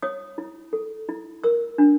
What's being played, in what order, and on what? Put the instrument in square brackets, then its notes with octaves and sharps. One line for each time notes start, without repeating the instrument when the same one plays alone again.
[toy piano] C#5 D#6
E4
A4
E4
A#4 E6
D4